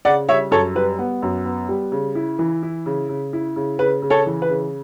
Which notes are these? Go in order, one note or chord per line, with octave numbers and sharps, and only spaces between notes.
C#3 D5 F#5
G3 C#5 E5
F#2 A4 C#5
G3 B4
B3
F#2
B3
G3
C#3
E4
E3
E4
C#3
C#3
E4
C#3
C#3 B4
C#3
A4 C#5
E3
B4
C#3